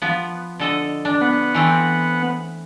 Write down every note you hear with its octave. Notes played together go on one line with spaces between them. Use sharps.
F3 B3
D3 A4 D#5
D4
B3 F#5
E3 A3 C4